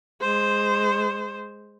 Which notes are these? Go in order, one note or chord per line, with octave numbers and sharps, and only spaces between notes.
G#3 C5